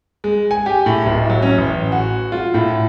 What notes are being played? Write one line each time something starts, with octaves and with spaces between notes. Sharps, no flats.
G#3
G#5
G4
A2
D1
F#3
C#4
A1
F#4
F4
A2